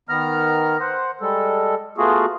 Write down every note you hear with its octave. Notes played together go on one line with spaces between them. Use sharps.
D#3 B3 A#5 F6
C5 F#5
G3 G#3 A4
A3 B3 F4 F#4 G#4